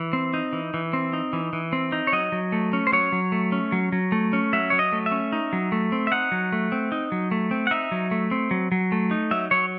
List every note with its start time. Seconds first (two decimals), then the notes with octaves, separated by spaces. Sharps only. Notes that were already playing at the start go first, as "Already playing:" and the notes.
Already playing: E3
0.13 C4
0.34 D#4
0.53 E3
0.74 E3
0.93 C4
1.13 D#4
1.33 E3
1.53 E3
1.73 C4
1.92 D#4
2.07 C#5
2.13 F#3 D#5
2.32 F#3
2.52 A3
2.73 C#4
2.87 C5
2.92 F#3 C#5
3.12 F#3
3.32 A3
3.52 C#4
3.72 F#3
3.92 F#3
4.12 A3
4.33 C#4
4.53 F#3 E5
4.70 F#3 C#5
4.79 D#5
4.92 A3
5.06 E5
5.12 C#4
5.32 D#4
5.53 F#3
5.72 A3
5.92 C4
6.07 E5
6.12 D#4 F#5
6.32 F#3
6.52 A3
6.72 C4
6.92 D#4
7.12 F#3
7.31 A3
7.51 C4
7.67 F#5
7.71 D#4 E5
7.92 F#3
8.11 A3
8.31 C4
8.51 F#3
8.72 F#3
8.92 A3
9.11 D#4
9.31 F#3 E5
9.51 F#3 C#5